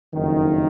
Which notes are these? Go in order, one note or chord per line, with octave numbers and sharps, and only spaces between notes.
F#1 F2 D#3